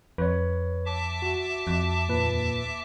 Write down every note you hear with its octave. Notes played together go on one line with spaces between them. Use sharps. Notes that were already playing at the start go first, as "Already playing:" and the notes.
F2 B4 C#5
E5 A5 D6
F#4
F2
D#2 A#2 B4